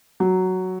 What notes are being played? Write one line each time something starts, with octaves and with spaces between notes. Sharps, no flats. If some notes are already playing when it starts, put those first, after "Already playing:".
F#3